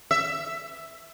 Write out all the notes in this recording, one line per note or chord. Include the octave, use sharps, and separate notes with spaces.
E5